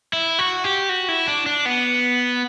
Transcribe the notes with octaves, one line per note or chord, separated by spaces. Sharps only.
E4
F#4
G4
F#4
E4
D4
D4
B3